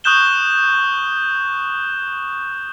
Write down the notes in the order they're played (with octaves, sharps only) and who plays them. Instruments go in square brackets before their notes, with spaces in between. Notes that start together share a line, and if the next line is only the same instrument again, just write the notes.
[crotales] C#6 D#6 F#6 G6 E7 G7